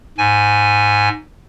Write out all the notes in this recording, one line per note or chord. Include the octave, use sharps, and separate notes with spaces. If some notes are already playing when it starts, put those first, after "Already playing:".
G#2 G#5